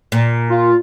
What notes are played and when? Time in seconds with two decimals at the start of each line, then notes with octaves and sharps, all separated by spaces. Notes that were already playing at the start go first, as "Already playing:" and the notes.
0.12 A#2
0.50 F4